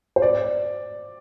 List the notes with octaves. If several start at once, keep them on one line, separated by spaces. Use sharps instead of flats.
C5
D5